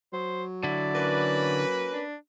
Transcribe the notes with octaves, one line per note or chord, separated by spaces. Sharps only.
F#3 C5
D3 E4 D5
A#3 C#4 B4
D4